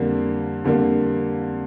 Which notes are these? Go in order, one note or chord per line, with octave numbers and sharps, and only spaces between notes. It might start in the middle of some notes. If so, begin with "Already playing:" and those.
Already playing: F2 D3 G3 A#3
F2 D3 G3 A#3